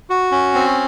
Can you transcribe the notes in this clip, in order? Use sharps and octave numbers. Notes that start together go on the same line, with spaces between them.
F#4
C#4
C4